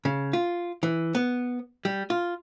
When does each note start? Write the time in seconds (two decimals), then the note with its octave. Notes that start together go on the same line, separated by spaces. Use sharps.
0.05 C#3
0.33 F4
0.83 E3
1.15 B3
1.85 G3
2.10 F4